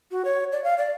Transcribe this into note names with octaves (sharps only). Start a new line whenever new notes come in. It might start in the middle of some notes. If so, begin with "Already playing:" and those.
F#4
C#5
D5
F5
D5